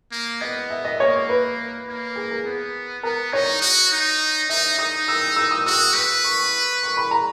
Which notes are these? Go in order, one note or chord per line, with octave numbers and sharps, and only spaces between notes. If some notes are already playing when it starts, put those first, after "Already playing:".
A#3
B3 D#5
E5
D#5
A#3 C#5
B4
A#3
G#4
A#4
B3
B3 A#4
D#4 C#5
F#4
D#4
D#4 E5
D#4 D#6
E6
E6
D#6
F#4 E6
B4
C#6
C#6
B5
A#5